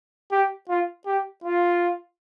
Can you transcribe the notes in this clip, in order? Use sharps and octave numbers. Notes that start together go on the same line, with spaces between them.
G4
F4
G4
F4